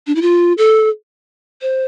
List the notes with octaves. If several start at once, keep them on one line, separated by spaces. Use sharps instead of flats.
D4
E4
F4
A4
C5